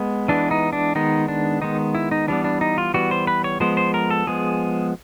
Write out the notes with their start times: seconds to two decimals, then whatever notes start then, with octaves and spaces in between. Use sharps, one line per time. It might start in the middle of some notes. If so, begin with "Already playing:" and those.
Already playing: G#3 B3
0.28 E3 G#3 B3 D4
0.51 D#4
0.73 D4
0.95 D#3 G#3 B3 D#4
1.28 D4
1.62 D#3 G#3 B3 D#4
1.95 E4
2.11 D#4
2.28 E3 G3 B3 D4
2.44 D4
2.61 D#4
2.78 F4
2.94 E3 G3 B3 F#4
3.11 C5
3.27 B4
3.44 C#5
3.60 F3 G#3 B3 C5
3.77 C5
3.94 A#4
4.10 A4
4.27 F3 G#3 B3 G#4